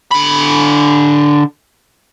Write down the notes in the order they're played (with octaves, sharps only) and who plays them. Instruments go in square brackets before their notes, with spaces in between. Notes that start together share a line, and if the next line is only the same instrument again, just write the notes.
[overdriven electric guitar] D3 B5